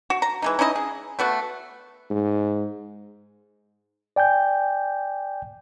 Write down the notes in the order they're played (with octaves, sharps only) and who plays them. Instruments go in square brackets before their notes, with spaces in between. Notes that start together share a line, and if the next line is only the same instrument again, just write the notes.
[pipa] F#4
A#5
E3 G#3 D#4
C#4 D#4 E4 D#5
G#4
A3 B3 F#4
[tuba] G#2
[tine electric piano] D5 G5 G#5 G6